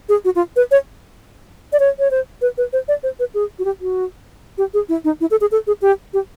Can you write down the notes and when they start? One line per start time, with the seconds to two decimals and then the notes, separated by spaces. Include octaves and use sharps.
0.09 G#4
0.25 F#4
0.35 F4
0.56 B4
0.71 C#5
1.72 D5
1.79 C#5
1.99 C#5
2.11 C5
2.41 B4
2.58 B4
2.73 C5
2.88 D5
3.03 C5
3.19 B4
3.34 G#4
3.59 F#4
3.65 G4
3.81 F#4
4.58 G4
4.74 G#4
4.89 E4
5.04 D#4
5.21 E4
5.31 A4
5.41 G#4
5.51 A4
5.67 G#4
5.82 G4
6.13 G4